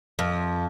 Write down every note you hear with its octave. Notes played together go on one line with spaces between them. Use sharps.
F2